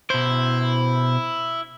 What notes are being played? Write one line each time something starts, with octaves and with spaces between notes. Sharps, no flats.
B2 E4 C5